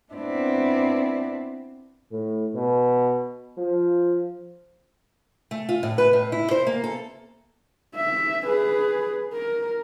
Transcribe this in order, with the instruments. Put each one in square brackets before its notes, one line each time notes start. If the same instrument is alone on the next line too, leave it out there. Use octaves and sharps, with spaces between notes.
[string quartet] B3 C4 D4 E4 D5
[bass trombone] A2
B2
F3
[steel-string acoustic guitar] A3
F4
A2
B4
A2
E4
C5
A#3
A4
[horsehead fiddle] E5
G#4 B4
A#4